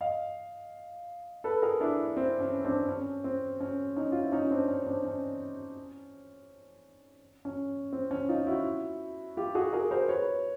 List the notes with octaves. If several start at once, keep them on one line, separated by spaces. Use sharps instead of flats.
D#5 F5
A4 B4
G#4 A#4
D4 E4
C4
C#4
C4 D4
C#4
C4
C#4
C#4 D#4
F4
E4
C#4 D#4
C4 D4
C#4
C4 D4
C#4
C#4
C4
C#4
D#4 F4
E4 F#4
F4 G4
F#4 G#4
G#4 A#4
A#4 C5
B4 C#5